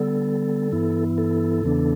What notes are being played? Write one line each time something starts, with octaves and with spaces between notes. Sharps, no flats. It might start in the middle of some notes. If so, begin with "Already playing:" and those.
Already playing: D3 G3 B3 A4
G2 E3 B3 E4
A4
E2 C#3 E3 B3 D4